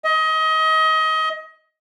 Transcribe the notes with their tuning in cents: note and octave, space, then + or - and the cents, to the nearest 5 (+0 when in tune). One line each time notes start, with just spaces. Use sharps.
D#5 +25